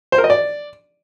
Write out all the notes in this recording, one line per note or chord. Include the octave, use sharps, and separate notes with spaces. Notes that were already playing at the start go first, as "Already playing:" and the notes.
C5
A#4
D#5
D5